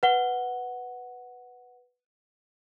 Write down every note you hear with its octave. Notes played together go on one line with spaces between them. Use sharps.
B4 F#5 G7